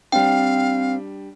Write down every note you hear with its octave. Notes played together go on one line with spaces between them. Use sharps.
G3 C4 D4 F5 G5